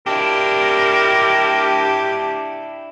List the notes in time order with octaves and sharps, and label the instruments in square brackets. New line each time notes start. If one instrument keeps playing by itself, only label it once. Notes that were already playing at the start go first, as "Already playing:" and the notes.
[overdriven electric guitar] D4 E4 [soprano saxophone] G4 [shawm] A#4